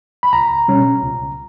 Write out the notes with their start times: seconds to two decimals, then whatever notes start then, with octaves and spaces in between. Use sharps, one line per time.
0.23 B5
0.33 C#2 A#5
0.68 B2 G3 C#4
1.02 C#2